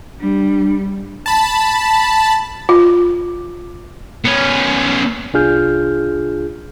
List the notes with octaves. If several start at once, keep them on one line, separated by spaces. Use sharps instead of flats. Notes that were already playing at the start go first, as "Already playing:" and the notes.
G3 D4
A5 B5
F4
B3 C#4
C2 D4 F4 G#4 F6 G6